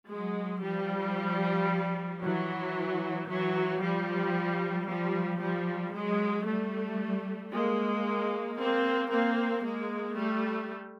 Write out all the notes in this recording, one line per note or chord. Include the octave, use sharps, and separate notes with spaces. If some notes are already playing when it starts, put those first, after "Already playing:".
F#3 G#3
F3 G3
E3 F#3
E3 F#3
F3 G3
F3 G3
F3 G3
F#3 G#3
G3 A3
G#3 A#3
A#3 C4
A#3 C4
G#3 A#3
G3 A3